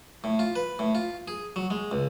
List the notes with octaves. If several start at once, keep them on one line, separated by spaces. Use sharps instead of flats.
A2
F4
B4
A2
F4
G#4
F#3
G#3
C#2